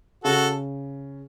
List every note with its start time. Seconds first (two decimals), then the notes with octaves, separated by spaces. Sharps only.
0.24 C#3 F#4 A4